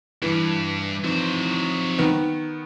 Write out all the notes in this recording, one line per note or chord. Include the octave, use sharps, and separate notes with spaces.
G2 E3
F3 F#3 C4 D#4 C5
D#3 B3